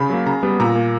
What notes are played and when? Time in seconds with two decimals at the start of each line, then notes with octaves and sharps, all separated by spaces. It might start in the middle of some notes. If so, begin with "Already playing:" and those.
Already playing: C#3 B5
0.10 F#3 A#3
0.26 C#3 A#5
0.43 G3 B3
0.60 A#2 A#5
0.76 A#3